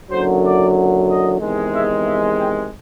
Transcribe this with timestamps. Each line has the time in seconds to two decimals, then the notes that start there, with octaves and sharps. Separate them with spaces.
0.11 F#1 F#2 D3 F#3 C5
0.44 D5
1.08 D#5
1.40 E2 C3 D#3 G#3
1.73 E5
2.05 E5
2.38 G5